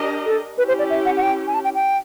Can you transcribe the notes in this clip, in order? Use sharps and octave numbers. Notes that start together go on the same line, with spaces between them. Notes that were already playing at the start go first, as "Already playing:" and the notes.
Already playing: D4 G4 A#4 D#5
A4
C#4 E4 G4 B4
C5
D5
E5
F#5
F#5
G5
G#5
A5
G5
G5